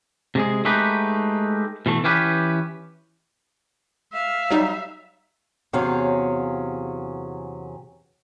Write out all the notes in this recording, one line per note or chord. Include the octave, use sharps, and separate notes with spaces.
C3 G#3 G#4
G#3 A3 D#4 G4 B4
B2 E3 A3
E3 C#4 G4 B4
E5 F5
F#3 G3 D#4
E2 C3 F#3 C#4 G#4 F5